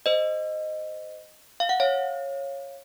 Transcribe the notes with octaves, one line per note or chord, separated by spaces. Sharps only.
C5 D#5
F5
F#5
C#5 F5